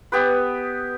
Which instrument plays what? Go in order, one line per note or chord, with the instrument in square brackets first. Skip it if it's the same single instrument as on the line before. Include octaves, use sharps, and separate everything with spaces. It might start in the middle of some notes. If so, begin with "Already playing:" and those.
[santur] B3 G4 B4